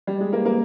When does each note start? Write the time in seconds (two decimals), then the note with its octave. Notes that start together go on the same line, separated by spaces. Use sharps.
0.07 G3
0.20 G#3
0.33 A#3
0.45 A#3